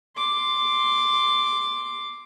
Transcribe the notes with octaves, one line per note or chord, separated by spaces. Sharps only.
C6 D6